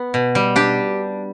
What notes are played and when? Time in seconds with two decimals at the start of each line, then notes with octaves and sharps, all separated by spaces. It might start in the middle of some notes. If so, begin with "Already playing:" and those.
Already playing: B3
0.14 B2
0.35 G3
0.56 D4 G4